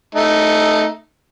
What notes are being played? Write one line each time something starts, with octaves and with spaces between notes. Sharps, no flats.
A3 D#4